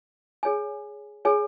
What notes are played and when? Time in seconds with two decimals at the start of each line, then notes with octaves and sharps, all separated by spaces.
0.43 G#4 C#5 G#5
1.25 G#4 C#5 G#5